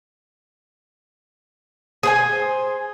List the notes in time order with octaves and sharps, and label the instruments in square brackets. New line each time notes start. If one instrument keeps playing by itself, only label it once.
[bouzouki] G#4 C5 G#5